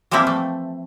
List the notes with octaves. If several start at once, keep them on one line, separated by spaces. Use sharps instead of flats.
E3 F3 G3 A#3 C4 E4
A3